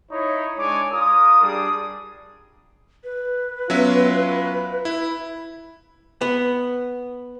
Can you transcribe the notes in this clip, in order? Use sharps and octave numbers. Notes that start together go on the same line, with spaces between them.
D#4 E4 C#5
G#3 D4 C#5 G#5 D6
F4 A#4 D#6
G3 D4 G#4 D#6
B4
F#3 B3 C#4 F4 E5
B5
E4
B3